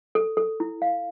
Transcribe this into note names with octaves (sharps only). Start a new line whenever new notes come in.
A4
A4
E4
F5